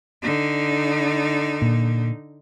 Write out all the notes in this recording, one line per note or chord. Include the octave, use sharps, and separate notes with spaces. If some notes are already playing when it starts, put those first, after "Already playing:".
D3 D#4
A#2